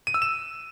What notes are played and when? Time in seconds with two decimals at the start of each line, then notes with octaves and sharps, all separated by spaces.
0.07 D#7
0.14 E6
0.22 E7